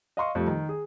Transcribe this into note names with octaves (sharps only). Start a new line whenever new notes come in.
D#5 F5 C6 C#6
F2 G3 A3
D#3
G#4